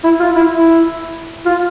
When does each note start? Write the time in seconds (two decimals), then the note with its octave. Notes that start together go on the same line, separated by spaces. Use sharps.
0.04 E4
0.20 F4
0.36 E4
0.51 E4
1.46 F4